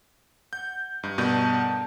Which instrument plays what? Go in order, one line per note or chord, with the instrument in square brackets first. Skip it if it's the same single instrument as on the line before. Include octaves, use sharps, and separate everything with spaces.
[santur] F#5 [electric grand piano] G6
[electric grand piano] G2 [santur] D#4
[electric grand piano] G2 B2 G6 [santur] D4 A4 A#4